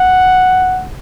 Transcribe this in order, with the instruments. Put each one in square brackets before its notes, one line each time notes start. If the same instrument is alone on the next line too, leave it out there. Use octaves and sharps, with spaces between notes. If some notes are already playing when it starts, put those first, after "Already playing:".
Already playing: [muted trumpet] F#5